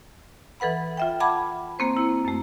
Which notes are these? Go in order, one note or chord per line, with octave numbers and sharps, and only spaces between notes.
E3 A4 B4 F#5 B5
F4 E5 G5
F#5 A5 B5 D6 G#6
A#3 C4 C5
E4
F#2 A3